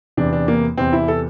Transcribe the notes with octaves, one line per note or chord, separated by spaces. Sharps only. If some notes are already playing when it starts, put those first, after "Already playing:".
E2 C3 E3 D4
D4
A#3
E2 C3 E3 C4
E4
A4